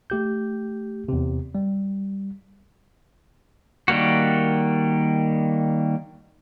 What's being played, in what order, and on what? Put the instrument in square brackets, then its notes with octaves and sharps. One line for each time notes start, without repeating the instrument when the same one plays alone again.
[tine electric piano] A3 G4 G6
E2 C3
G3
[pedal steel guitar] D#3 G3 A#3 F#4